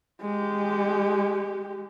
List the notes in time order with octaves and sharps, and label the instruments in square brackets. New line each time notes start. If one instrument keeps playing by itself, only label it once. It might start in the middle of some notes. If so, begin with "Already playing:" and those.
[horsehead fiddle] G#3 G4